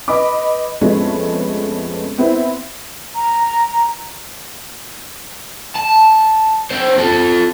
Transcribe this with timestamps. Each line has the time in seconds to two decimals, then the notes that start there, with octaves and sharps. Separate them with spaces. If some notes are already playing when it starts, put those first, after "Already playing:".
0.08 B4 D#5 B5 D6
0.81 F2 G#3 A3 B3 C#4
2.18 B3 C4 E4
3.15 A#5
5.75 A5
6.71 C#4 C5
6.99 F4 A4